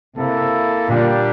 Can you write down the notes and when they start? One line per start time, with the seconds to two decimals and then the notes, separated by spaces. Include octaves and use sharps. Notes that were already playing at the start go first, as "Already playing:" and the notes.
0.17 C3 A#3 E4 A4
0.89 A#2 D3 G3 A#3 D4 G4